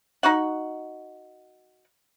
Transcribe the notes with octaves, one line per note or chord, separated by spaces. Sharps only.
D#4 F#4 F#5